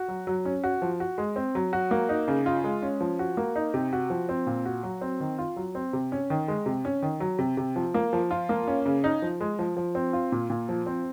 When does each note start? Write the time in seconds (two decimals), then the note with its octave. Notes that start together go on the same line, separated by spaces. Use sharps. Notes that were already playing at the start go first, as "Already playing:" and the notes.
Already playing: F#4
0.08 F#3
0.27 F#3
0.45 C#4
0.64 F#4
0.82 F3
1.00 F#4
1.18 G#3
1.36 C4
1.55 F#3
1.73 F#4
1.91 A#3
2.09 D#4
2.28 C#3
2.46 F4
2.64 G#3
2.82 C#4
3.01 F3
3.19 F#4
3.37 A#3
3.56 D#4
3.74 C3
3.93 F#4
4.10 F3
4.29 C4
4.47 A#2
4.65 F#4
4.83 F#3
5.01 C4
5.20 D#3
5.38 F4
5.57 F#3
5.75 C4
5.93 C3
6.12 C#4
6.30 D#3
6.48 G#3
6.66 C3
6.85 C#4
7.02 D#3
7.20 F#3
7.39 C3
7.57 C3
7.76 F3
7.94 A#3
8.13 F3
8.31 F4
8.49 A#3
8.67 C#4
8.86 C#3
9.04 D#4
9.22 F3
9.40 G#3
9.59 F3
9.77 F3
9.95 C4
10.13 F4
10.32 A#2
10.50 A#2
10.69 F3
10.86 C4